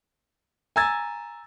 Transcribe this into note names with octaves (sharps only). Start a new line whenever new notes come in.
G#5 A#5 E6 G#6 A6